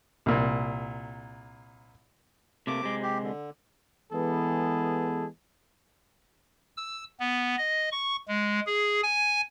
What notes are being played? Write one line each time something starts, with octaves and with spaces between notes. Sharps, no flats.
C2 A#2
C3 A3 A#3 D6
C3 G#3
G4
D3
E3 G#3 B3 G#4 A4
E6
B3
D#5
C#6
G#3
G#4
G#5